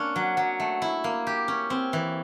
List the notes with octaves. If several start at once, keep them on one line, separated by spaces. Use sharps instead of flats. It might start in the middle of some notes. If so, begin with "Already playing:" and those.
Already playing: A#3 C#4 D4
F#3
F#3
A3
E4
A#3
G4
C#4
C4
E3